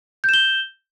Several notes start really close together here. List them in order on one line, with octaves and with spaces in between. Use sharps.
G6 E7 G7